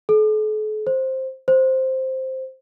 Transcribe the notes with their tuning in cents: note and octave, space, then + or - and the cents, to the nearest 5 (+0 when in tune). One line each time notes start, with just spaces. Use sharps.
A4 -45
C5 +5
C5 +0